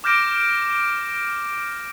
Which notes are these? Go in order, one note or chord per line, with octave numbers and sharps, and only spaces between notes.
D6 F6 G6 A#6 D7 E7